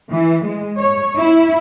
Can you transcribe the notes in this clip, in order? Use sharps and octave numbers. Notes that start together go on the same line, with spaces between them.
E3
G#3
C#5
E4